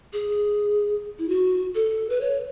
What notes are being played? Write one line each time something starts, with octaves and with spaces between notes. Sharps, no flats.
G#4
E4
F#4
A4
B4
C#5